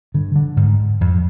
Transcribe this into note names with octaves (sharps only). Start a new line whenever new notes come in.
G2 D3
D3
G#2
F2